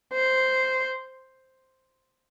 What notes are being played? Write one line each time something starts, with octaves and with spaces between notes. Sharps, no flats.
C5